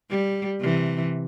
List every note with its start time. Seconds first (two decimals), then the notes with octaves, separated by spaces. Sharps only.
0.10 G3
0.60 C3 E3